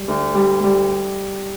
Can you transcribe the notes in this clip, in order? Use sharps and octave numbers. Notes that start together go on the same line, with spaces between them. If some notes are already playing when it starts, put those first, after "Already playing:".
Already playing: G3
D2
G3
G3